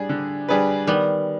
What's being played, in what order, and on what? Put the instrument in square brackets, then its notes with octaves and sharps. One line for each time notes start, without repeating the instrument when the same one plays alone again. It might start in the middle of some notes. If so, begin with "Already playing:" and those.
Already playing: [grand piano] G3 D4 G#4
D3
G3 D4 G#4 B4
[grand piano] D#3 [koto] G3 B3